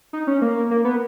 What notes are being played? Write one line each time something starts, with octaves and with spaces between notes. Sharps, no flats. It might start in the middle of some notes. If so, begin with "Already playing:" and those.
D#4
C#4
A#3
A#3
B3